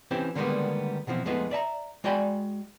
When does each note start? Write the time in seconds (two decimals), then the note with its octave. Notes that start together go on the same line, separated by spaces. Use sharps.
0.11 E3 C4 C#4 G4
0.35 D3 D#3 G3 G#3 A#3 B3
1.07 B2 E3 F3 C4
1.25 F2 G#3 A3 B3 D#4 F4
1.51 D5 E5 A5 A#5
2.04 G#3 F#4 D5 G5 G#5 B5